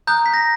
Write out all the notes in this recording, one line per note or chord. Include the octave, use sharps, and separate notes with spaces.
A#5 D#6 F#6 G6
B6
A#6